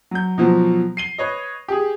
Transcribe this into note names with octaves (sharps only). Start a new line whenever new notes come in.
F#3 G6
B2 F3 F#3
C7 D#7 G7
B4 C#5 D#5
G4 G#4